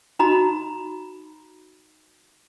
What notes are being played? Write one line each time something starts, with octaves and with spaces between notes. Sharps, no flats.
D#4 F#4 A#5 B5